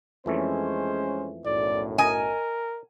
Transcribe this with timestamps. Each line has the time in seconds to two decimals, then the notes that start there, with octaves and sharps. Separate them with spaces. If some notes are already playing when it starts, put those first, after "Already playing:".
0.26 F2 E3 G#3 A3 C#4 C5
1.45 B1 F#2 A2 D5
1.98 A#4 D#5 G#5